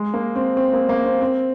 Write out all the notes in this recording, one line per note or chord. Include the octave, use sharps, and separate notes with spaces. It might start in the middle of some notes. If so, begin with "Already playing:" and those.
Already playing: G#3
A#3
C4
C4
A#3
A#3
C4
C4